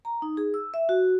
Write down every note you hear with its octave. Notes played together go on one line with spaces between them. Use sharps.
A#5
D#4
G#4
E6
E5
F#4